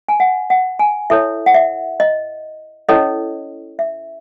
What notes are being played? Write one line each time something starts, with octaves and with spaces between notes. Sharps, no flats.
G#5
F#5
F#5
G#5
E4 A4 C#5 E5
F#5
E5
D#5
C#4 E4 A4 C#5 D#5
E5